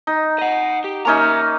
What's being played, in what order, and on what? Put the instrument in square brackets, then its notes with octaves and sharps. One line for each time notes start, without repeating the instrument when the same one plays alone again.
[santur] D#4
[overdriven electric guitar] D#5 F#5
G4
[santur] A#3 C#4 D#4 [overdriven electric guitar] E5 A#5